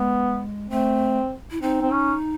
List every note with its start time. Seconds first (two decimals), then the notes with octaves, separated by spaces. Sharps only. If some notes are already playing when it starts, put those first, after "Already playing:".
Already playing: G#3 B3
0.70 A3 C4
1.51 E4
1.61 C4 D#4
1.82 C4
1.92 C#4